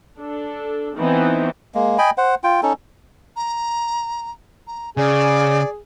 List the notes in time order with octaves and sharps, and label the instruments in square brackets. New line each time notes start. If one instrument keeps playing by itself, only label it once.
[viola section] D4 A4
E3 B3 C4 D#4
[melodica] G#3 A#3
D#5 G5 G#5 B5
C5 F#5
F4 G5
C#4 D#4 A4
[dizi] A#5
A#5
[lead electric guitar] C#3 [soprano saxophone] G#4 [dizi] D5